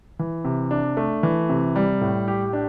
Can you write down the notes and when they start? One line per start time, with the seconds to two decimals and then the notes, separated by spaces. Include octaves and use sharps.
0.19 E3
0.45 C3
0.71 D4
0.97 A3
1.23 E3
1.49 C3
1.76 G3
2.01 A2
2.28 G4
2.53 D4